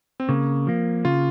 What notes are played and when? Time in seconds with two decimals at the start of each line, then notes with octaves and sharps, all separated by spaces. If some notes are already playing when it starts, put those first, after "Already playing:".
0.20 C4
0.29 C#3 A#3
0.67 F3 A#3
1.05 C#3 F4